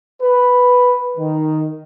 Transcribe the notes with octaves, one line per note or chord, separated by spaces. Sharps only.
B4
D#3